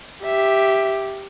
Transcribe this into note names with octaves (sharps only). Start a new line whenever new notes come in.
G4 E5